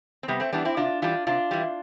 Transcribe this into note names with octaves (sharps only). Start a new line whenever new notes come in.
C4
C3 G3 B3
A3 C4
E3 G3 B3 D4
C4 E4
C3 D4 F4
E3 G3 D4 F4
C3 D4 F4
E3 G3